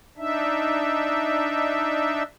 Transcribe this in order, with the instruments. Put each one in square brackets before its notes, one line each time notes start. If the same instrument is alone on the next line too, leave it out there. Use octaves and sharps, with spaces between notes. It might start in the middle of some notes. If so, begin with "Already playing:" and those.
[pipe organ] D4 D#4 E5